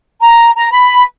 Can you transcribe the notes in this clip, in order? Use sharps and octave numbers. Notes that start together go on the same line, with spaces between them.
A#5
A#5
B5